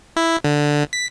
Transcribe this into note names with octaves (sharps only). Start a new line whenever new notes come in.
E4
D3
B6